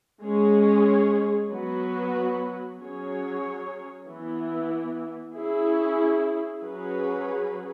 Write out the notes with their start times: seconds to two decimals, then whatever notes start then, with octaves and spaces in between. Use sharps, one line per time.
0.24 G#3 C#4 G#4 C#5
1.51 F#3 B3 F#4 B4
2.79 F#3 C#4 G#4 C#5
4.07 E3 B3 E4
5.35 C#4 E4 G#4
6.61 F#3 C#4 G#4 B4